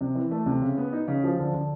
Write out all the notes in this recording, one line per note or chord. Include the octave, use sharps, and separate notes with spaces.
C3
E3
A3
C3
C#3
B3
D#4
C#3
F3
D3
D3